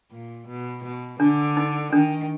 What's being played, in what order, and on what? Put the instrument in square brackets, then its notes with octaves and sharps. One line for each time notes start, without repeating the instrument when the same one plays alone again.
[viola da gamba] A#2
B2
B2
[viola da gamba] D3 [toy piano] D4
[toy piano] D#4
[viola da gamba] D#3 [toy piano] D4